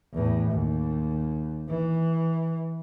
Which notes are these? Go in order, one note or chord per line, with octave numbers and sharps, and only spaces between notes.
E2 A2
D#2
E3